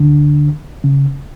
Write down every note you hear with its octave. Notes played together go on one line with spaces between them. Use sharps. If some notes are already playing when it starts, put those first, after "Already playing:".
Already playing: D2 D3
C#3